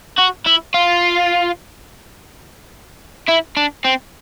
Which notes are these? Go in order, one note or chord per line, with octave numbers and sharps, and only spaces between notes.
F#4
E4
F4
E4
D4
C4